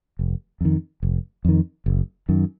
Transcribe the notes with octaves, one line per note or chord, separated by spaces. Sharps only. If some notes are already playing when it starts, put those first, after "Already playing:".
F1
F2 D#3
F1
F2 D#3
F#1
F#2 D#3